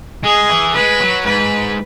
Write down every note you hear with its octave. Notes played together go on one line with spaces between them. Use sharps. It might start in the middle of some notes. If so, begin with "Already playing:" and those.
G#3 G#4
E3
G#3 B4
F#3
G#2 B4